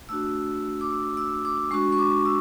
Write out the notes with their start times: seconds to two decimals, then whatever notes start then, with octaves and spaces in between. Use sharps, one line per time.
0.09 A3 D4 F#4 E6
0.81 D6
0.91 E6
1.17 E6
1.45 D6
1.71 G#3 D4 F#4 C#6
1.92 C#6
1.98 D6
2.25 E6